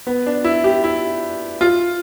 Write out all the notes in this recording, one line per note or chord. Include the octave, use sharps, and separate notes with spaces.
B3
D4
E4
G4
E4
F4